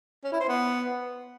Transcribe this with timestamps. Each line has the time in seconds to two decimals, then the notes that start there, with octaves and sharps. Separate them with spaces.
0.24 C#4
0.32 E4
0.40 C5
0.49 B3